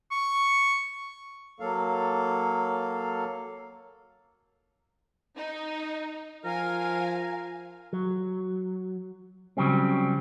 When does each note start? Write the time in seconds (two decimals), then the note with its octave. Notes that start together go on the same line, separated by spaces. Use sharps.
0.11 C#6
1.60 F#3 A#3 A4 F5
5.37 D#4
6.45 F3 A#4 F5 G#5
7.93 F#3
9.57 C#3 F#3 G3 C4